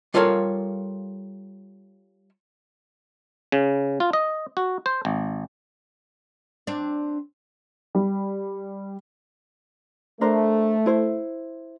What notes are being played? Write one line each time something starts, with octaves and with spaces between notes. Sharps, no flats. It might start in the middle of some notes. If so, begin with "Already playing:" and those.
G3 F4 A4 A#4 C#5 F5
C#3
F4
D#5
F#4
C5
G#1
C4 D4
G3
A3 D4 A#4 C5
E4 C5